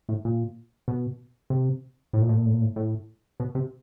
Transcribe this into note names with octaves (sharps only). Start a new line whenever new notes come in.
A2
A#2
B2
C3
A2
A#2
A2
A#2
A2
A#2
A2
A2
B2
C3